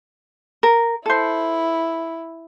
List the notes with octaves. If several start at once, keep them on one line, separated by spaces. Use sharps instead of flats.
A#4
E4 A4 C5